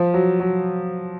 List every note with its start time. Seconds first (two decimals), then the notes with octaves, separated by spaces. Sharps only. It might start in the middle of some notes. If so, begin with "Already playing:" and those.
Already playing: F3
0.14 F#3
0.40 F#3